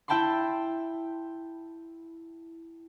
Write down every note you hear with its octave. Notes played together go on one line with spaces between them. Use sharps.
E4 E5 G5 A5 B5 C6